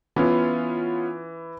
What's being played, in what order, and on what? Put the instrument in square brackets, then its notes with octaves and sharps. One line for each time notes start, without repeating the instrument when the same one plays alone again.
[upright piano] E3 [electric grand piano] B3 C#4 F4